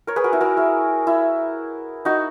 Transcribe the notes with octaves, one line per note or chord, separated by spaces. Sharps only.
A#4 C#5
G#4 B4
F#4 A#4
E4 G#4
F#4 A#4
E4 G#4
E4
D#4 F#4